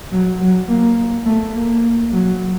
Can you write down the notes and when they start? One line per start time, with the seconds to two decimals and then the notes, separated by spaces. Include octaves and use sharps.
0.12 F#3
0.40 F#3
0.68 A#3
1.26 A3
1.54 A#3
2.12 F#3